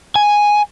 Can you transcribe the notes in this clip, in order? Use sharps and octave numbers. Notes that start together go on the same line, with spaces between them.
G#5